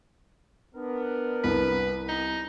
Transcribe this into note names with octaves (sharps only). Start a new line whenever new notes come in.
B3 D4 A#4
C2 B4
D#4